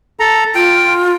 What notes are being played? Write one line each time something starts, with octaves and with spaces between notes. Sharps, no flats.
A4 A#5
F4 G5